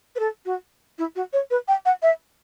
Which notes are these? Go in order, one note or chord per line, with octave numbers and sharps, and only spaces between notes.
B4
A4
F#4
E4
F#4
C#5
B4
G5
F#5
E5